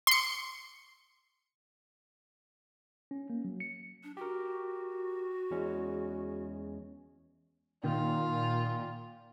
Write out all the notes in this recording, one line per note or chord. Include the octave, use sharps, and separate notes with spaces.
C6 C#7
C#4
A#3
F#3
C#7
D4
F#4 G4 A#4
E2 G#3 C#4
A#2 D#3 F4